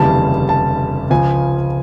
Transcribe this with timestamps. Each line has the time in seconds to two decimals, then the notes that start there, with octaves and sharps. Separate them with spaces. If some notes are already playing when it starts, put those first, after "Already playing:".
Already playing: F1 D#2 C#3 E3 G3 A5
0.49 A5
1.10 C#2 C#3 F3 G#5